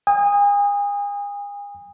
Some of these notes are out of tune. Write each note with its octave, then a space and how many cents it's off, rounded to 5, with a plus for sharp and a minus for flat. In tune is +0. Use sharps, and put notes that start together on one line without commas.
G#5 -40 D#6 +0